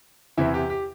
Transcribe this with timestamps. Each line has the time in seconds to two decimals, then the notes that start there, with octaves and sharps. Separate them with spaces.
0.38 E2 C3 E3 E4
0.54 G4
0.70 G4